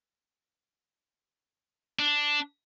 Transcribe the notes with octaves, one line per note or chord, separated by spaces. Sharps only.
D4